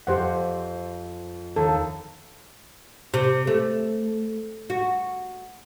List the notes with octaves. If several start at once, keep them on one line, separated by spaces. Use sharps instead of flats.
F2 G4 C5 F#5
D#2 A4
C3
A3
F#4